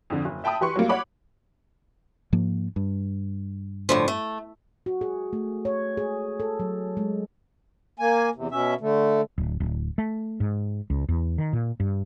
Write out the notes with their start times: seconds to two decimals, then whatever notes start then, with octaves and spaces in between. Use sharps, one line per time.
0.10 F2 D3
0.25 F#1
0.44 E5 G5 A5 B5 D#6
0.61 E3 G4 B4 C6 C#6 C#7
0.75 F#3 G3 A#3
0.89 C#5 F#5 B5 D6
2.33 G#2 F3 A#3
2.76 G2
3.89 A2 D3 F3
4.08 A3
4.86 F#4
5.01 G#4
5.33 A3
5.65 C#5
5.97 G#4
6.40 A4
6.60 F#3
6.97 G#3
7.99 A#3 G#5
8.35 E2 C3
8.51 B2 C#4 E5
8.81 D3 A3
9.38 D1
9.60 D1
9.98 A3
10.40 G#2
10.90 C#2
11.09 E2
11.38 D#3
11.53 A#2
11.80 G2